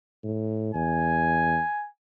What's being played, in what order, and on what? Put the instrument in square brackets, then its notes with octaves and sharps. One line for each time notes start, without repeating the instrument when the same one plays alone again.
[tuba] A2
[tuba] E2 [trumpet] G#5